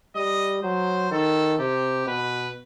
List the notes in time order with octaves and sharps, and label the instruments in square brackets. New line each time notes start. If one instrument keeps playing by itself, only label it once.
[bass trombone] G3 [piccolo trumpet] D#5
[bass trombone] F#3 [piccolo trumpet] C5
[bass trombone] D#3 [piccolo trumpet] A4
[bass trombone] C3 [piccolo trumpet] G4
[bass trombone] B2 [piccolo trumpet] B4